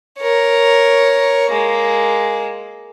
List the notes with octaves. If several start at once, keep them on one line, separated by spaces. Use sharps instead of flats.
A#4 C#5
G#3 A#3